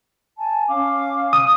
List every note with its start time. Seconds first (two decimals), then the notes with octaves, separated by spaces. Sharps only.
0.38 G#5 A5
0.69 C#4 F5 D6
1.33 D#6